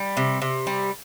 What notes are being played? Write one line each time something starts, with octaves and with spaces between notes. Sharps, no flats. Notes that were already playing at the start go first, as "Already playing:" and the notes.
Already playing: G3
C3
C3
G3